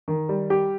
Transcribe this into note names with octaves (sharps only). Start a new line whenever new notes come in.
D#3
G3
G4